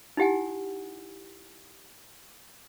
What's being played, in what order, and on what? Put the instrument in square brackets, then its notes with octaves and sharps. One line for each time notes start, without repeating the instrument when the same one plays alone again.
[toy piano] D#4 E4 G4 F#5 G#5